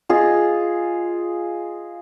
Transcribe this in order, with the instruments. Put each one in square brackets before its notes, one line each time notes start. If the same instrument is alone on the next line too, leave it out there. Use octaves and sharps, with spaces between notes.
[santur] F4 G#4 D#5